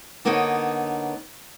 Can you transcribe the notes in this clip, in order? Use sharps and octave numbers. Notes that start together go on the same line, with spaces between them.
D3 A#3 B3 D#4 C#5